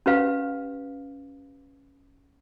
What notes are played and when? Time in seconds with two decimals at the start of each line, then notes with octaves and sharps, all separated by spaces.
0.06 C#4 G4 B4 F5